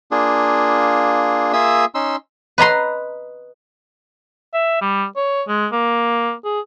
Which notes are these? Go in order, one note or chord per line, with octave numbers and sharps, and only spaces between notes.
A#3 D4 F4 G#4
A#3 F4 G#4 E5 D#6 E6
C#4 D#4 C6 E6
B4 D#5 A#5 C6
E5
G3
C#5
G#3
A#3
G#4